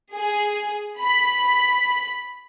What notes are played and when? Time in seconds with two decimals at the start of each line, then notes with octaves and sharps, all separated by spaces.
0.15 G#4
1.00 B5